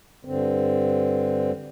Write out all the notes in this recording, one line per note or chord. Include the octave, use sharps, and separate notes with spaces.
G2 D3 C4